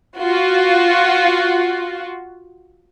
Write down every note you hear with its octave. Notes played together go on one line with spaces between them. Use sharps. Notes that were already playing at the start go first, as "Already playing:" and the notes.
F4 F#4